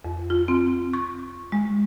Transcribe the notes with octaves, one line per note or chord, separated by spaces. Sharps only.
F2
F4
C4
C#6
G#3